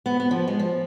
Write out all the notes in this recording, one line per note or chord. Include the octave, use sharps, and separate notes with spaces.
B3
B3
F3
G#3
F3